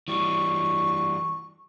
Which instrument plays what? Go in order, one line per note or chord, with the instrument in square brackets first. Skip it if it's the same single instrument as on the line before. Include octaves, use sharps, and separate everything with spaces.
[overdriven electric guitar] E3 G3 [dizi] C#6